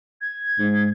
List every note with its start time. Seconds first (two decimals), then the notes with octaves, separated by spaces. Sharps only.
0.21 G#6
0.59 G#2